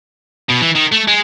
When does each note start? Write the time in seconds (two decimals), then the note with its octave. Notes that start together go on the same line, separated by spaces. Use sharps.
0.49 B2
0.61 E3
0.75 D#3
0.92 A3
1.08 G#3